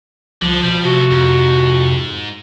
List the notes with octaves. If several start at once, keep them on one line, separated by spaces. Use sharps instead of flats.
C2 D3 F3
B2 G3
D2 C3 F#4 A4
F2 G#2